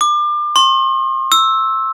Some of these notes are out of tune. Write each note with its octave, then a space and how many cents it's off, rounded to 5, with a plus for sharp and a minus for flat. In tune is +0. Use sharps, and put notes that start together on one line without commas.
D6 +30
C6 +40
E6 -5